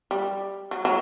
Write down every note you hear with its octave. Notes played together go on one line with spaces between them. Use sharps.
G3
F#3
F#3